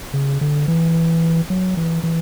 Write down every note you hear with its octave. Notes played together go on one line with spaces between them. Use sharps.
C#3
D3
E3
F#3
E3
E3